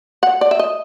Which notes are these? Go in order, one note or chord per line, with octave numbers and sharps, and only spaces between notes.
F#5
D5
E5
D#5